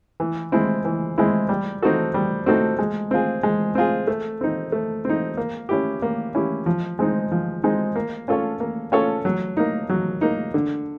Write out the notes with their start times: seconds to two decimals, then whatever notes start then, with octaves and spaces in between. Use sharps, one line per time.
0.20 E3
0.52 G#3 C4 E4
0.85 E3
1.18 G#3 C4 E4
1.49 G3
1.82 C4 D#4 F#4 A4
2.14 G3
2.46 C4 D#4 F#4 A4
2.79 G#3
3.11 C4 F4 G#4
3.43 G#3
3.75 C4 F4 G#4
4.07 A3
4.41 C4 D#4
4.72 A3
5.05 C4 D#4
5.37 A#3
5.69 C#4 E4 G4
6.02 A#3
6.35 C#4 E4 G4
6.66 F3
6.99 G#3 C4 D#4
7.32 F3
7.63 G#3 C4 D#4
7.96 A#3
8.28 C#4 F4 A4 C#5
8.60 A#3
8.92 C#4 F4 A4 C#5
9.25 F#3
9.57 A#3 D#4
9.89 F#3
10.21 A#3 D#4
10.54 D3